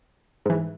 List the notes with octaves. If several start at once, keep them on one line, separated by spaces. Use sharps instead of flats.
G#2 E3